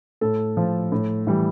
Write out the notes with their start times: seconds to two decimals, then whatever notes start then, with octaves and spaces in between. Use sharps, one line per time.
0.21 A2 A4
0.57 F3
0.92 A2
1.27 E3 G3